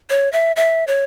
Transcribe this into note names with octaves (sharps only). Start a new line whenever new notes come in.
C#5
E5
E5
C#5